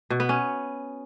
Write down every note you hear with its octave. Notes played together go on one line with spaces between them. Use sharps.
B2
B3
C#4